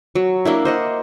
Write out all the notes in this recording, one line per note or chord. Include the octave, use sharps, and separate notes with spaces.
F#3
A#3 D4 E4
C5 D#5 F#5